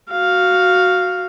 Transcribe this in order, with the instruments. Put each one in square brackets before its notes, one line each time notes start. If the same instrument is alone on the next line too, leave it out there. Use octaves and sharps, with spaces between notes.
[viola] F#4 F5